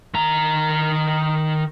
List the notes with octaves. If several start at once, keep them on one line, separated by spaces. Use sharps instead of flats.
D#3 A#5